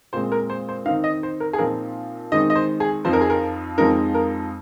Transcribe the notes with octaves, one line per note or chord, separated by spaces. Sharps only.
A#2 G#3 C4 C5
A#4
C5
C5
D#3 C4 D#4 F5
D#5
C5
A#4
G#4
A#2 F3 C4 D#4 A#4
D#3 G#3 C4 D#4 D#5
D#5
C5
G#4
F2 F3 C4 D#4 C5
A#4
G#4
A#4
F2 F3 G#3 C4 D#4 A#4
A#4